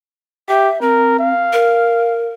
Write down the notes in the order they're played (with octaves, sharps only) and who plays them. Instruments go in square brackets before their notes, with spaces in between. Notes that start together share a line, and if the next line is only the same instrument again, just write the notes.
[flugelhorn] G4 [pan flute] E5
[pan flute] C4 [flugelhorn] A#4
[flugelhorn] F5
[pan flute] A#4